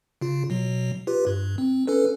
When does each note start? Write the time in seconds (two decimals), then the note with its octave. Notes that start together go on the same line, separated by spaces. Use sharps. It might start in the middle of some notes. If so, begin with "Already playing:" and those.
0.21 C#3 F4
0.50 B2 F#3
1.07 F4 G4 B4
1.27 G2
1.58 C4
1.87 C#4 A4 B4